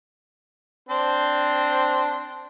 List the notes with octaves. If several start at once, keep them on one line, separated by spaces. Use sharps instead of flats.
C4 D4 C5